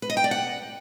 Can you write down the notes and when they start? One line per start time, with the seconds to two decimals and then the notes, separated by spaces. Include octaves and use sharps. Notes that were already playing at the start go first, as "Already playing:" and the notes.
0.02 B4
0.10 D#5
0.17 G5
0.24 D5
0.31 F#5